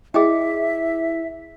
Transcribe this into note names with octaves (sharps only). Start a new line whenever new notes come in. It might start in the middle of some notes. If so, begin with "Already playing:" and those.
E4 G#4 D#5 E5 G5